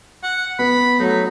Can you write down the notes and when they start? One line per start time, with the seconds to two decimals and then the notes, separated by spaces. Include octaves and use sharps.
0.23 F#5
0.59 B3 B5
1.00 F#3 A3 D#4